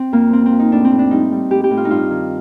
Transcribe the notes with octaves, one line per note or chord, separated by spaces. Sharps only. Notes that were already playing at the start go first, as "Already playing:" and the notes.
Already playing: C4
F2 A#3
F3 C4
C4
F3
D#4
A2 D4
C4
A2
D4
G3 D#4
G3
A2 G4
G4
A2
F4
D#4
G2 F4
D#3